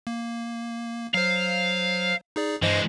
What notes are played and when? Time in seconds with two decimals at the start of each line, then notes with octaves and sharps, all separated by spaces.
0.07 A#3
1.14 F#3 C5 F5
2.36 D#4 G#4 D5
2.62 G2 E3 G#3 C5 D#5